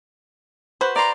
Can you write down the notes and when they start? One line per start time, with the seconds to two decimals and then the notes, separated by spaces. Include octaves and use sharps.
0.81 F#4 B4 C5
0.96 D5 A#5 C6